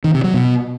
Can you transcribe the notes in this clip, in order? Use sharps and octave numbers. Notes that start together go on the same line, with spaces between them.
D#3
C3
F#3
B2